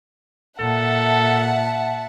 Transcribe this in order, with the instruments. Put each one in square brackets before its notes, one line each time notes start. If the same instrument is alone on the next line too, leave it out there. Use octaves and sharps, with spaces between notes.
[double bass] A#2 [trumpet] A4 [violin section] E5 F#5 A5